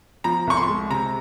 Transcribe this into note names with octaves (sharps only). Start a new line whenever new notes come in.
F3 A#5
C2 C#6
C6
G#3
C3 A#5